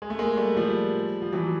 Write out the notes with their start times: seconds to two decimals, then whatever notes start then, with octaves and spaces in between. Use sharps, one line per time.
0.02 G#3
0.10 A3
0.19 G#3 A#3
0.37 G3 A3
0.56 F3 G3
1.22 F3
1.33 E3 F#3